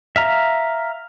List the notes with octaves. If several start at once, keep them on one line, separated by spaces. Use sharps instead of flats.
E5 F5 A#5